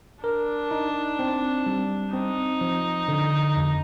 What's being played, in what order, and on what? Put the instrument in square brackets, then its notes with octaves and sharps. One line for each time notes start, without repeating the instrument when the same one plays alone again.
[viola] D4 [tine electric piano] A#4
[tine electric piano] D#4
C4
G3
[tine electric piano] C4 [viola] D#4
[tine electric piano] F3
D3
F2